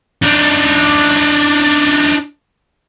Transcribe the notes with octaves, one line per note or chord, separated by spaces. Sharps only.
D4 D#4